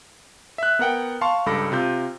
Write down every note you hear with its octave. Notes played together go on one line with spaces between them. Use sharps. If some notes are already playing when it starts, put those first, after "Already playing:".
E5 F#6
B3 A#4 F#5 G5
F5 A5 C6 C#6
C#2 G2 A4 B5 D6 A#6
C3 F4 G6